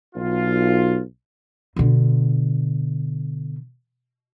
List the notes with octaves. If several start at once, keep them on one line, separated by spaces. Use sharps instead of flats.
B1 F4
B2 D3